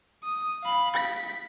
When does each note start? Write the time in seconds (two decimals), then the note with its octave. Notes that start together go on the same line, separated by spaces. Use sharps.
0.24 D#6
0.63 F5 B5
0.97 B6